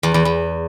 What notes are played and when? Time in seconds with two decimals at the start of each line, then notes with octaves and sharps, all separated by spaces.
0.03 E2
0.14 E2
0.25 E2